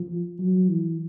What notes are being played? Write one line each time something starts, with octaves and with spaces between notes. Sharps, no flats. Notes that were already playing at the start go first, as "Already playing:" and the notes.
Already playing: F3
F#3
E3